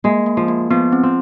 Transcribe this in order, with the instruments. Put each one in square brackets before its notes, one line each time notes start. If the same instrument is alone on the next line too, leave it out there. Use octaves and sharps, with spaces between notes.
[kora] G#3 [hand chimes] A#3
[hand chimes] A#3
[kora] F3
[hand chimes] A#3
[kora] F3 [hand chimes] B3
[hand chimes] C4
[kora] C4